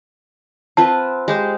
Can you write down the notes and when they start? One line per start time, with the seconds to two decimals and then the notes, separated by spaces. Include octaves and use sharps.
0.77 C4 F4 B4 A5
1.28 G#3 G4 C5